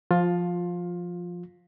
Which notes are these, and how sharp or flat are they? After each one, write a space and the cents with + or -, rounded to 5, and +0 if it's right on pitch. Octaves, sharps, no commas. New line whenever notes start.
F3 +0 F4 +15